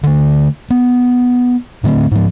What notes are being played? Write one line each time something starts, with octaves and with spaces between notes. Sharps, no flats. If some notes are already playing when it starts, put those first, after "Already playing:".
D3 A3
B3
A2 D3 A3 C4
G#2 F3